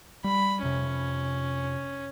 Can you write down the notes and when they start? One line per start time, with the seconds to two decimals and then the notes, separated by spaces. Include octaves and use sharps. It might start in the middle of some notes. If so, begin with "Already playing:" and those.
0.24 G3 B5
0.63 F2 C3 C#4